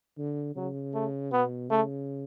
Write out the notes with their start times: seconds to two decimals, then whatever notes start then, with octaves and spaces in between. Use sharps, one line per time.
0.18 D3
0.56 C#3 F#3
0.94 A3
1.32 B2 B3
1.70 C#3 A3